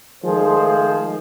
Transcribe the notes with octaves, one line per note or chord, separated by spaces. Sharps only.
D#3 F3 G#3 A3 G#4 C5